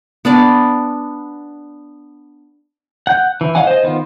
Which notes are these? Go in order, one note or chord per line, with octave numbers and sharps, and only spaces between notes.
B3 D4 D5
F#5 G6
E3
D#5 F5 F#5 G#5
C5 D#5
D#3 B3 F4